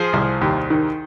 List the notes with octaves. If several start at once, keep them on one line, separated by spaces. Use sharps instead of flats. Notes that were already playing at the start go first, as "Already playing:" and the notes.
Already playing: F3 G#4 C5
C2
D#2
D#3